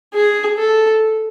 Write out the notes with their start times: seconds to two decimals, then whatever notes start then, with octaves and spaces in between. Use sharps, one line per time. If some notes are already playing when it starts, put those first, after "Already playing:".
0.14 G#4
0.58 A4